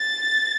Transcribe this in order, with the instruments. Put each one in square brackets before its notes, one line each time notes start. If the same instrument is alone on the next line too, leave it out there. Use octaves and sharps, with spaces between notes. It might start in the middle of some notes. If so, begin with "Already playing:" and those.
Already playing: [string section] A6